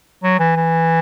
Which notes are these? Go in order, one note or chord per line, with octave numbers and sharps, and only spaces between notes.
F#3
E3
E3